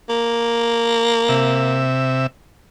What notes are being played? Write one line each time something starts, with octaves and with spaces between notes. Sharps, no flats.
A#3
C3 E5